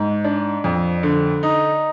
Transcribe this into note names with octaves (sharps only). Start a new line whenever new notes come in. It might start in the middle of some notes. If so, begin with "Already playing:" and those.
Already playing: G#2
D4
F2
D3
D#4